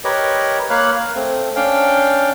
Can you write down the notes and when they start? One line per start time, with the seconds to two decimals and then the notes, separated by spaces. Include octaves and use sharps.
0.04 G4 A#4 B4 C#5 D#5
0.70 A#3 C#5 F5 B5 F#6
0.96 F5
1.16 A3 C4
1.56 C#4 D4 F5 G5